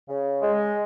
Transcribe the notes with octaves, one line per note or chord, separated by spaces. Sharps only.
C#3
G#3